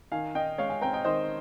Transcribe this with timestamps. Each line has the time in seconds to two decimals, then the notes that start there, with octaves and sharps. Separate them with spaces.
0.12 D#3 F5 G#5
0.35 D#4 D#5 G5
0.58 G#3 C#5 F5
0.70 F5 G#5
0.81 C4 G5 A#5
0.93 D#5 G5
1.04 D#3 C5 D#5